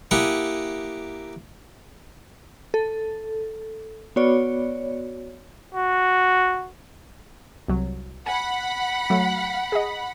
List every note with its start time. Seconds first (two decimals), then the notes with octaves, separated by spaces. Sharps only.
0.11 A#3 E4 G4 F#5 G#5 D#6
2.74 A4
4.16 B3 F#4 C#5 D5
5.74 F#4
7.68 C2 F#3
8.26 F#5 G#5 B5
9.10 F#3 A3
9.72 G#4 D#5